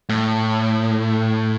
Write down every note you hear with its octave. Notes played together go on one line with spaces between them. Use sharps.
A2